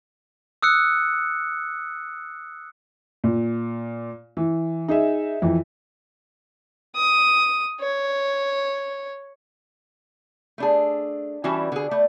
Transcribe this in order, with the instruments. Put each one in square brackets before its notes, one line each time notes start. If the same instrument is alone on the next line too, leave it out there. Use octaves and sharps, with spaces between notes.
[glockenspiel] D#6 E6 F#6 C#7
[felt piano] A#2
E3
D#4 G#4 E5
F2 E3
[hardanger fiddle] D#6
C#5
[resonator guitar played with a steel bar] A3 D4 G#4
E3 G3 C#4 F#4 E5 A5
D3 G#4
A3 D5